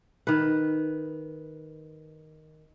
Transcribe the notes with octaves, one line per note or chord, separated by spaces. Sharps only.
D#3 B4